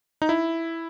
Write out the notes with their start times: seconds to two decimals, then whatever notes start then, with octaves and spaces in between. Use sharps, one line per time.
0.22 D#4
0.29 E4